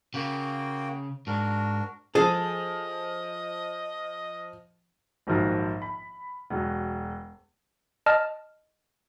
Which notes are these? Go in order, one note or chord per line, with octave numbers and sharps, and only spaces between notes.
C#3 A#3 F#4 G5
G#2 D4 F#4 A#4
F3 G#4 A4 D#5
A#1 G#2 D#3 F3 F#3
B5
E1 F#3
D#5 A5 F6